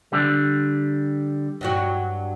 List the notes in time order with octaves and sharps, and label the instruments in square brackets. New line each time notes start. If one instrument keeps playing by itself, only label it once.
[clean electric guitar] D3 G3
[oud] G2 F#3 F#4